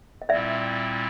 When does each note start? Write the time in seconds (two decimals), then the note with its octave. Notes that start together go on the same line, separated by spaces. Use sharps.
0.22 D#5
0.29 A#2 G3 C4 E4 D5 E5